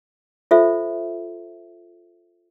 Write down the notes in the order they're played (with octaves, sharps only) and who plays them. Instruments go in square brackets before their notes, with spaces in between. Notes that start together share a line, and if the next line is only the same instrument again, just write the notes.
[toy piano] F4 A4 C5 E5